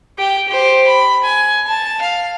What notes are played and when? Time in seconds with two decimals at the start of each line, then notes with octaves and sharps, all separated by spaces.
0.18 G4 G5
0.48 G4 C5
0.87 B5
1.24 G#5
1.67 A5
2.02 F5